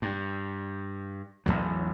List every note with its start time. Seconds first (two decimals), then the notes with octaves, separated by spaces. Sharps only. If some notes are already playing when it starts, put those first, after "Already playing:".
0.02 G2
1.46 A1 E2 G#2 F#3